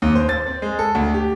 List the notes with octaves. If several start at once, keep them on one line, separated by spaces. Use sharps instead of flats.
D#2
C5
A6
C4
G#3
A4
D2
G4